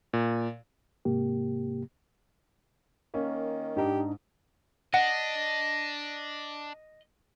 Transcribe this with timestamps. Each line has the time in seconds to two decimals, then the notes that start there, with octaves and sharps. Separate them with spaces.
0.13 A#2
1.05 G#2 C3 A#3 G4
3.14 D#3 A#3 C#4
3.77 G#2 D4 D#4 G4
4.94 D4 D#5 F#5